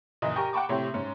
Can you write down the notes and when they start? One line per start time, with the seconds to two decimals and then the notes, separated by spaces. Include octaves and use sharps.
0.22 F#1 A#2 E3 D#5 A#5 D#6
0.36 G4 A#4 G#5 C#6
0.53 F#5 G5 A5 B5 C#6 D6
0.69 A2 C3 G4 C#5 C6
0.94 G#2 C#4